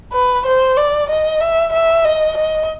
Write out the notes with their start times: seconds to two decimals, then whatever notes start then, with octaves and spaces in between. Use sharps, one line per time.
0.13 B4
0.46 C5
0.77 D5
1.10 D#5
1.41 E5
1.73 E5
2.04 D#5
2.37 D#5